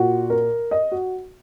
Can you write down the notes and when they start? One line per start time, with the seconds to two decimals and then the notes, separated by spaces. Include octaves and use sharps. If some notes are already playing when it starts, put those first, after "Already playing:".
Already playing: A#2 F#4
0.30 A#4
0.71 D#5
0.92 F#4